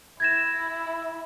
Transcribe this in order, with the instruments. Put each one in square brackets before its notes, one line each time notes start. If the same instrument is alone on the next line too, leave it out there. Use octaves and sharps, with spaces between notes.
[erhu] E4 [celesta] G#6 A#6 E7